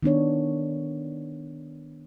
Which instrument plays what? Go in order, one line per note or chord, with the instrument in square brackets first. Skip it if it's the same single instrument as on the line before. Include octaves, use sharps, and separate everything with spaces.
[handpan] D#3 B3 D4 C#5